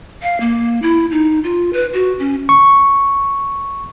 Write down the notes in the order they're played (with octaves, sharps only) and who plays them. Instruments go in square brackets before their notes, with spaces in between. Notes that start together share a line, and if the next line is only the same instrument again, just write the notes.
[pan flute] F5
A#3
E4
D#4
F4
B4
F#4
C#4
[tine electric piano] C#6